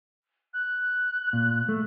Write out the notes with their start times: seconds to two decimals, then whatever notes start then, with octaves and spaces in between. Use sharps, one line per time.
0.53 F#6
1.33 A#2
1.69 A3